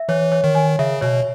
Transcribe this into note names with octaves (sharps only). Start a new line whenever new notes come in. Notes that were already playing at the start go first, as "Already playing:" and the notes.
Already playing: E5
E3 C#5
C#5
D#3
G#5
C#3 E5
B2 C#5